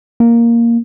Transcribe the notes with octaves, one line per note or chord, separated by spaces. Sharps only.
A#3